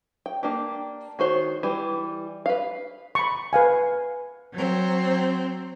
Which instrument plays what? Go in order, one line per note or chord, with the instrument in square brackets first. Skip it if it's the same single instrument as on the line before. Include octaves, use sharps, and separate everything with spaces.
[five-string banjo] G5
A#3 D4 G4
D#3 F#4 C5 C#5
E3 G3
B4 F5
[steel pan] B5 C#6
B4 F5 G#5
[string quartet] F#3 C4